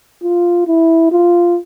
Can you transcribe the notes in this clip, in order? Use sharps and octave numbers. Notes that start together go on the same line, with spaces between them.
F4
E4
F4